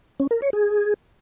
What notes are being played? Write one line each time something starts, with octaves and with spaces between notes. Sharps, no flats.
C#4
A#4
C#5
G#4